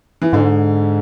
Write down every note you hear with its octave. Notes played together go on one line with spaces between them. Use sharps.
E3
G#2 D3